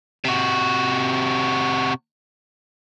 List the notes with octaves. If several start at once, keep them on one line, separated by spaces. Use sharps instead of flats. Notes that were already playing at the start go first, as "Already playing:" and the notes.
C3 F#4